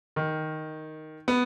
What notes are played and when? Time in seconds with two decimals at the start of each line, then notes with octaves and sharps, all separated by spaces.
0.16 D#3
1.28 B3